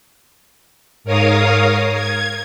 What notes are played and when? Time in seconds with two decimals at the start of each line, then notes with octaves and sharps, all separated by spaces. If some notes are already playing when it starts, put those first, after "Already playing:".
1.04 G#2 A#4 C#5 F5 D#6
1.94 G#6